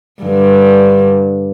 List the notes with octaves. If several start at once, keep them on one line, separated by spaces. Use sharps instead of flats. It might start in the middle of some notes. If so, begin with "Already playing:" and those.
G2 D3